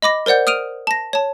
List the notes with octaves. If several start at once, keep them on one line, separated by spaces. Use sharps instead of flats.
D#5 B5 D6 A#6
A#4 C5 D5 F#5 G6
D#6 F6 D7 D#7 F7
A5 A#6
C#5 A5